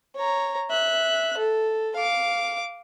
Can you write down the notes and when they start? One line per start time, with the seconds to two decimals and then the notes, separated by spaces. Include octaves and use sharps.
0.16 C#5 A#5
0.71 E5 F#6
1.38 A4
1.96 F5 D6